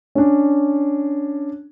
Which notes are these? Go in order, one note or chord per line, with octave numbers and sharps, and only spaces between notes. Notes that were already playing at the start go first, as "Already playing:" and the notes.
C#4 D4